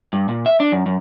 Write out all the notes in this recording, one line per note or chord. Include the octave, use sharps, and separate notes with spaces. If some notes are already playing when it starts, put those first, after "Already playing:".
G2
A#2
E5
D4
F#2
F#2